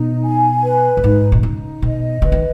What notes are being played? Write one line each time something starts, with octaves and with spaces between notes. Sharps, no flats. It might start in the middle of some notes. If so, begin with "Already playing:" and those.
Already playing: B2 D#4
G#5
B4
F#2
G#2 D#4
B2
C#3 D#4
B2 D#5
C#3 B4
D#3